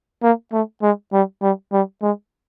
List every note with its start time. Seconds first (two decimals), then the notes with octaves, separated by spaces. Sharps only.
0.23 A#3
0.52 A3
0.82 G#3
1.13 G3
1.42 G3
1.73 G3
2.02 G#3